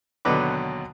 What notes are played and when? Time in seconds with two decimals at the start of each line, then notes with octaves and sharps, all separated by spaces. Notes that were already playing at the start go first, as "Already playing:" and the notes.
0.25 D#2 B2 D3 F#3 B4 D6